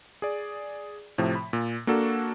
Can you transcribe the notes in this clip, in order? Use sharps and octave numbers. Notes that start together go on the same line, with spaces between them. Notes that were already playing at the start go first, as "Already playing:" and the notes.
G#4 D5
A2 C3 F3
B5
A#2
A#3 D4 F#4 A4